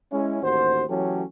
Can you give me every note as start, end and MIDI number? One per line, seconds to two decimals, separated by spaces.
0.12 0.41 56
0.12 0.41 61
0.12 0.41 64
0.43 0.84 33
0.43 0.84 39
0.43 0.84 66
0.43 0.84 72
0.89 1.23 52
0.89 1.23 54
0.89 1.23 57
0.89 1.23 61
0.89 1.23 67
0.89 1.23 69